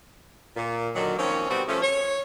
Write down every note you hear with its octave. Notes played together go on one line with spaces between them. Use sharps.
A#2
A#2 D3 D#3 F#3
D#3 F3 A#3 C4 C#4
B2 G3 B3 C4 E4 F#4
F3 A3 C#4
C#5